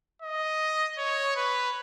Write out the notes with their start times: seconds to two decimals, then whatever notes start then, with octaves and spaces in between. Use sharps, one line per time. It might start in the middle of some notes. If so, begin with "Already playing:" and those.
0.22 D#5
0.98 C#5
1.36 B4